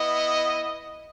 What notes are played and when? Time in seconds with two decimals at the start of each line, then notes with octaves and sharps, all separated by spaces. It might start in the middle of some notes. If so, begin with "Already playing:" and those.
Already playing: B3 E4 D#5